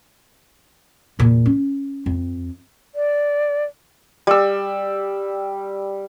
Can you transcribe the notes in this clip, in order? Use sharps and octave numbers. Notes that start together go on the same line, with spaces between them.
E2 A#2
C#4
F2
D5
G3 E6